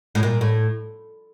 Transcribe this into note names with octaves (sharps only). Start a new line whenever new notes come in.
A2
A#2
A2